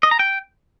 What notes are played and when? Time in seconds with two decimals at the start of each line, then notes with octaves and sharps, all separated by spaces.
0.03 D#5
0.11 A#5
0.19 G5